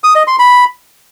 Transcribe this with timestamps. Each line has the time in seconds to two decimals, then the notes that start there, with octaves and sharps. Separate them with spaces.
0.04 D#6
0.16 D#5
0.27 C6
0.39 B5